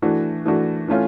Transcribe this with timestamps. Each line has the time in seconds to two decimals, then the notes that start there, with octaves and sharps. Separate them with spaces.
0.02 E3 A3 D4 F#4
0.45 E3 A3 D4 F#4
0.88 E3 A3 C#4 F4